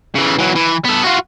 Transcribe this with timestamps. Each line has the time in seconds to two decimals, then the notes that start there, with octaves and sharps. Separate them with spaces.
0.15 C#3 E3
0.39 E3 F#3
0.55 E3
0.85 B3 A4
1.04 F4 F#4